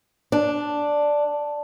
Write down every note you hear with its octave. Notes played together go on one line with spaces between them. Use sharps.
D4